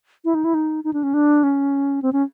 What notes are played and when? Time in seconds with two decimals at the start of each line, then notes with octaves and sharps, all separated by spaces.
0.25 E4
0.35 D#4
0.44 E4
0.54 D#4
0.84 D#4
0.93 D4
1.03 C#4
1.14 D4
1.43 C#4
2.02 C4
2.13 C#4